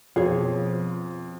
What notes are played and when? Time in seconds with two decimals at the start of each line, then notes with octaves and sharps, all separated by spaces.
0.16 F2 B2 F3 G#4 C#5